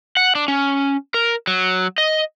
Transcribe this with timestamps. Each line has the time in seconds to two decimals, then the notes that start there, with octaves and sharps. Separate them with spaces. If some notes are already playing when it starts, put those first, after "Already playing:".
0.17 F#5
0.35 D4
0.48 C#4
1.14 A#4
1.47 F#3
1.98 D#5